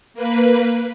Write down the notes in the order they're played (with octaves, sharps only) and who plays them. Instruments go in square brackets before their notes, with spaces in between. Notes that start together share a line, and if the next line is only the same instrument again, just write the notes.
[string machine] A#3 B4